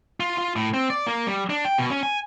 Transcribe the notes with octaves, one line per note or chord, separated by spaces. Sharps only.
F4
F4
A2
C4
D5
A#3
G3
D4
G5
B2
C#4
G#5